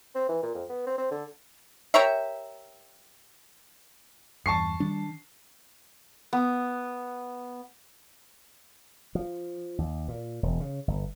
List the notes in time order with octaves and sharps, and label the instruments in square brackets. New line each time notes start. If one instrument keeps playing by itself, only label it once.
[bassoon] C4
E3
A#2
F2
B3
C4
C4
D3
[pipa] G4 A#4 C#5 E5
[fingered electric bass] E2 G2 [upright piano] A5 C#6 C7
[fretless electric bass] D#3 D4 [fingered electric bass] G3
[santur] B3
[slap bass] F3
D#2
A#2
E1
C#3
G1